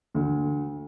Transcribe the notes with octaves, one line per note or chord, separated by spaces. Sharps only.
D2